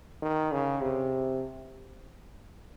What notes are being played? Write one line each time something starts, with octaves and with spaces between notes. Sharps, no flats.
D#3
C#3
C3